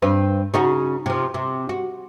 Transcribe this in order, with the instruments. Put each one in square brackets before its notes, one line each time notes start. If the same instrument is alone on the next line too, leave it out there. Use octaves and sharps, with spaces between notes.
[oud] G2 C4 B4
C#3 D#4 F#4
C3 F3
C3
F#4